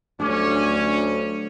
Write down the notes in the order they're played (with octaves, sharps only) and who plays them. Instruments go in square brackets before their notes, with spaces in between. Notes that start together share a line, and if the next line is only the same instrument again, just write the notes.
[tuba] D2 [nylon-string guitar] F#3 G3 A3 [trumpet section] C#4 [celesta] D4 D6